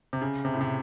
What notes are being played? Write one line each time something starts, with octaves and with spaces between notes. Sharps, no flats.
C3
C#3
C3
A2
C3